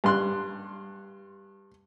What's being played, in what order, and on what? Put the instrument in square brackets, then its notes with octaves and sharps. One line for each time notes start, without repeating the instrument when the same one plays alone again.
[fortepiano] G2 C6 F#6